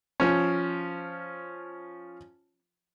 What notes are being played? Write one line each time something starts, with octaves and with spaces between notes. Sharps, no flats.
F3 C#4